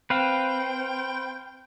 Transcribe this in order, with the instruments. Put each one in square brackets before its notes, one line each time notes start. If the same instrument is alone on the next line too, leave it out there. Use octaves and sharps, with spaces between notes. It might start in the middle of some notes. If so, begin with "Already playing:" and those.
[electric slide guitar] C4 [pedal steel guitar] B4 F5 [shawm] G5